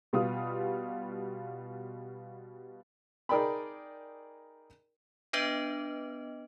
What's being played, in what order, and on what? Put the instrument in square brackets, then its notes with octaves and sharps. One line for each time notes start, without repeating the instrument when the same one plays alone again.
[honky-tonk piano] B2 G3 F4 D#6
[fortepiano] D#4 G#4 A#4 D5 G5 B5
[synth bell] B3 D4 B4 D#5